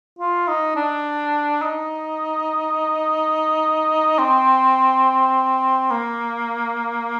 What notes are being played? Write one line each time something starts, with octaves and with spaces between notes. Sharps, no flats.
F4
D#4
D4
D#4
C4
A#3